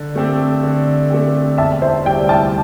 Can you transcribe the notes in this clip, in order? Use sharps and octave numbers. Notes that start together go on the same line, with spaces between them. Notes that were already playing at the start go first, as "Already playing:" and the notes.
Already playing: D3
A3 C4 G4
D3
A3 C4 G4
E1 E5 A5
C5 E5
D2 C3 G3 D5 G5
E5 A5